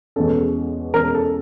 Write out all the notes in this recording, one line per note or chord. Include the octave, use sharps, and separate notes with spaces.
E2 B2 G#3 C#4 A4
E2 B2 G#3 C#4 A#4
A4